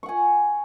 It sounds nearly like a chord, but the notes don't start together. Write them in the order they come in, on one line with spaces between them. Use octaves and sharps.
C#6 F#5 G#5